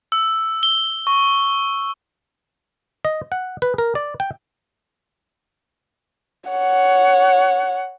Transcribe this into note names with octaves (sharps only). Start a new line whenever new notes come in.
E6
G7
C#6
D#5
F#5
B4
A#4
D5
G5
C#5 F#5